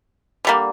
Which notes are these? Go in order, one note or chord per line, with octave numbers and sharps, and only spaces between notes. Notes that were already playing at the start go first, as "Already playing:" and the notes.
D3 G3 A#3